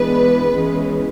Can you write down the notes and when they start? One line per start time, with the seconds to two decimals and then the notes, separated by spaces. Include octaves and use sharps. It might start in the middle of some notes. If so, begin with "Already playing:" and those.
Already playing: E3 G#3 B3 D4 B4
0.55 E3 G#3 C#4